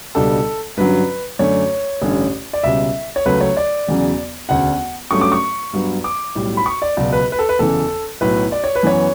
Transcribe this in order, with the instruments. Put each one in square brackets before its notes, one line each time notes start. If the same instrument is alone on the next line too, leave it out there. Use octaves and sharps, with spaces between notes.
[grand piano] C#2 B2 G3 D4 A4
G2 D3 F#3 C#4 B4
F#2 D3 A3 D4 C#5
A1 G2 D3 A3 C#4
D5
C#2 B2 G3 C#4 E5
C#5
C#2 C#3 F#3 A3 B4
C#5
D5
E1 E2 C#3 F#3
E1 D2 C#3 F#5
G2 F#3 A3 C#4 C#6
D6
C#6
G2 F#3 B3
D6
B1 A2 G3
B5
C#6
D5
C#2 B2 F#3 D5
B4
B4
A4
B4
F#1 E2 C#3 E3 A4
B1 A2 F#3 B4
D5
C#5
B4
F#2 E3 B3 C#5